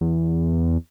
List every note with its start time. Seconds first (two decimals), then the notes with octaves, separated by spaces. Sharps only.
0.01 E2